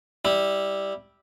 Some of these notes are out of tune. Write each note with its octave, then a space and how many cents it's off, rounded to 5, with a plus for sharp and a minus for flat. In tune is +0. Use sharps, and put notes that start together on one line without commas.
G3 +0 E4 -15